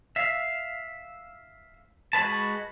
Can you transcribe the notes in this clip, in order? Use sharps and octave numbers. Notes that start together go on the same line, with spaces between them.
E5 F5
G#3 F#4 B4 A5